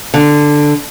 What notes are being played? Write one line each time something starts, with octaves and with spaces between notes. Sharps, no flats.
D3